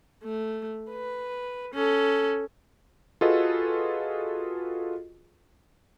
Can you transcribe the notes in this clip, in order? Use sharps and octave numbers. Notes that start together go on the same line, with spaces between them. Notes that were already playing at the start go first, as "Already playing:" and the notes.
A3
B4
C#4 A4
F4 F#4 G#4 A4 B4 D#5